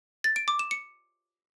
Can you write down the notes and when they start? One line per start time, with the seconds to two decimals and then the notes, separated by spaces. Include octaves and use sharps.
0.24 A6
0.36 D7
0.48 D6
0.59 E7
0.71 C#7